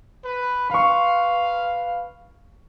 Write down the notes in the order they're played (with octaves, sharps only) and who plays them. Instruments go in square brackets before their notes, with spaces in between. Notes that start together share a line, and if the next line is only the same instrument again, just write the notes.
[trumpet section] B4
[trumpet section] B4 F5 [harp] C6 C#6